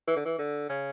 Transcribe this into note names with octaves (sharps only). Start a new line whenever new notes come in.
E3
D3
E3
D3
C#3